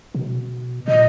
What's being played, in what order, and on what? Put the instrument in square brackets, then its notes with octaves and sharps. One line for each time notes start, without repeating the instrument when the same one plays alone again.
[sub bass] B2
[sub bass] A#2 [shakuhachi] D#5